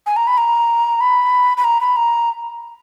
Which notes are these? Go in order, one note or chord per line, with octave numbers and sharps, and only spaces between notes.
G#5
A#5
B5
A#5
B5
B5
A#5
B5
A#5